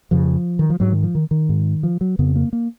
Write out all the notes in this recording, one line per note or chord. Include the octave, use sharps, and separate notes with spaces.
F2 C#3 F3
D#3
F3
G#2 F#3
D#3
F3
D#3
D#3
G#2
F3
F#3
F2 C#3 B3
A#3
A#3